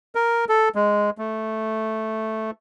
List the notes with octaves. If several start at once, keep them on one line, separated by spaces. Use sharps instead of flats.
A#4
A4
G#3
A3